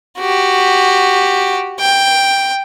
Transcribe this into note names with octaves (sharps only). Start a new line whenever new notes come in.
F#4 G4
G5